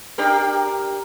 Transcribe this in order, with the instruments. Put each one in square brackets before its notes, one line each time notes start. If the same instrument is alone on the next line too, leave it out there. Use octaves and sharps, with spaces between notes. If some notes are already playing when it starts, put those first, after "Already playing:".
[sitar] D4 G4 A#4